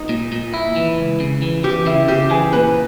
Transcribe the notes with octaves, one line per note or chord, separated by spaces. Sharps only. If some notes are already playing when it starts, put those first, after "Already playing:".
Already playing: D#4
A#2
A#2
E4
E3
C#2
C#3
E3
E3 G4
C#3 E4
C#3 G4
E3 G#4
A#2 B4